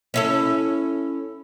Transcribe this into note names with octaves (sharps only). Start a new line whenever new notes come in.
C#4 E4 A4